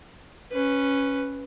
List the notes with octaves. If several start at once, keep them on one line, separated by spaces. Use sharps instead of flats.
C#4 B4